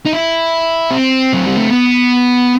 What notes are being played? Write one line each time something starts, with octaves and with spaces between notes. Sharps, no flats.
D#4
E4
C4
F#3
G3
A3
B3